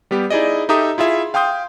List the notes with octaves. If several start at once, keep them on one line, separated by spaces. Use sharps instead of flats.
G3 B3 G4
D#4 E4 G#4 D5 D#5
D#4 G4 A4 E5 A#5 D#6
E4 F4 G#4 E5
F5 G5 C6 D#6 G6